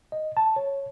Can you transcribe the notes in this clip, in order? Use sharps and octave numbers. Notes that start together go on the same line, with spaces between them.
D#5
A5
C#5